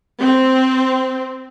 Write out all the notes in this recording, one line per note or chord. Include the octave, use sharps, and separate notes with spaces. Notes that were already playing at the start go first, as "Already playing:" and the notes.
C4